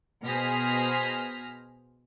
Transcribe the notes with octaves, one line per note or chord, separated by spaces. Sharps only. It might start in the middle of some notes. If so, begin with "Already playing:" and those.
B2 G#4 C5 F6 A#6 B6